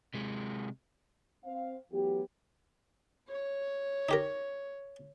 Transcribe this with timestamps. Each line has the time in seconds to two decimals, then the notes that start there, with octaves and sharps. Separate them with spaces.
0.14 C3 G#3
1.45 C4 F5
1.91 E3 F#3 A3 B3 F#4 G4
3.28 C#5
4.09 D#4 G4 A#4